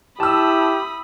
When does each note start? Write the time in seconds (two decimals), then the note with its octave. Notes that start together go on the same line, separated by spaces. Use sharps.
0.20 E4 G4 A5 B5 D#6 E6